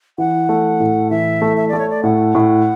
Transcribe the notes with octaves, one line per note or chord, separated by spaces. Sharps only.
E3 F#5
A3
A2
E3 E5
A3
E5
A3 D5
C#5
D5
A2 F#5
A2